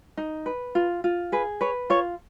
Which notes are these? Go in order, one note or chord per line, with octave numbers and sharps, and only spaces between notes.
D#4
B4
F4
F4
G#4 B4
B4 C#5
F4 C#5